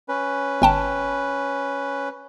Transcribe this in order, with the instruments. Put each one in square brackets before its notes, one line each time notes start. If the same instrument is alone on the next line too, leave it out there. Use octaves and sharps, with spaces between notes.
[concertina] C#4 B4
[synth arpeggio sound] G1 G5 A5